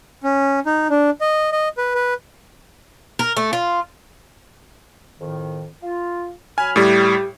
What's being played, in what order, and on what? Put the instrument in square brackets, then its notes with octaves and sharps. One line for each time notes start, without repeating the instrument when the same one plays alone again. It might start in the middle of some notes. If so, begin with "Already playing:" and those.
[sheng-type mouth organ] C#4
D#4
D4
D#5
D#5
B4
B4
[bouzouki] A#4
A3
F4
[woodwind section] F2 A2 D#3
F4
[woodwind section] F#3 B5 F6 [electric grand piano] G#5
[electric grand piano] A2 G3 [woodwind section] G4